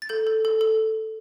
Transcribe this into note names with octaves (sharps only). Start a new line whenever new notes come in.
A6
A4 G6
A4
A4
A4